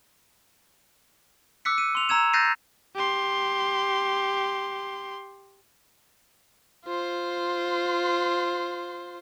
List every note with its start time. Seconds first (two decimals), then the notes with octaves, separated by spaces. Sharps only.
1.65 D6 E6 F#6 B6 C#7
1.78 D#7
1.95 C6 F7
2.09 A#5 E6 G#6 E7
2.33 F#6 G6 A6 A#6 C7 D#7
2.95 G4 C6
6.86 F4 C5